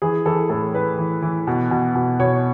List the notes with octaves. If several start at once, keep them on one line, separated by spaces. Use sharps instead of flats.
E3 G#4
E3 A4
A2 A4
A2 B4
E3
E3
B2
B2
B2
B2 C#5